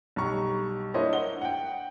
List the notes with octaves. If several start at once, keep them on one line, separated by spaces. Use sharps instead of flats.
B1 G3 A#5 C#6
A#3 D4 E4 C5 C#5 D#5
F#5 G7
F#5 G5